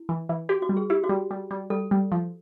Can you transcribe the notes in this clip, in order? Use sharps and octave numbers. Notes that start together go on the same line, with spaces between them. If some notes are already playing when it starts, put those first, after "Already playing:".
Already playing: E4
E3
E3
F#4 G4
F#4
G3
G#4
E4 G4
F#4
G3
G3
G3
G3 A4
G3
F3